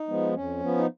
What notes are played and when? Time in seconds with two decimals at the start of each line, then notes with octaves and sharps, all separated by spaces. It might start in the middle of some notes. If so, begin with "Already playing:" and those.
Already playing: D#4
0.08 F3 G#3 B3
0.35 F2 C#4
0.60 F3 B3
0.77 D#4